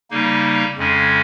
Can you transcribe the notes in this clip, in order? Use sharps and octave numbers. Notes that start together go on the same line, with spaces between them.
C#3 G3 A#3 D#4
F2 C#3 G#3 C#4